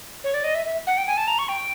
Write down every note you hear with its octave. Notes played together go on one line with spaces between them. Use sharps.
C#5
D5
D#5
E5
E5
F#5
G5
G#5
A5
A#5
C#6
G5